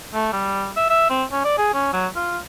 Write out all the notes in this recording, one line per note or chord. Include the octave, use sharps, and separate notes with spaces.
A3
G3
E5
E5
C4
C#4
D5
G#4
C#4
F#3
F4